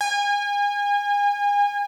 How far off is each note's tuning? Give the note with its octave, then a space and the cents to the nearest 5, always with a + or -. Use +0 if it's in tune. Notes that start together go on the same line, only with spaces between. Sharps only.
G#5 -30